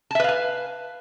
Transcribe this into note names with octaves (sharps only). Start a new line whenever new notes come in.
B4 E5 F5 G#5 A5